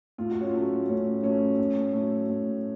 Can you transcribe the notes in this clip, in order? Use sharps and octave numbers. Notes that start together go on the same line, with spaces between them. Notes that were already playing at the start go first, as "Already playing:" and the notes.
A2 F4
F#4
C#4 F4
F#3 A3
A2 C#4
F#3 A3 C#4
A2
F#3 A3
A2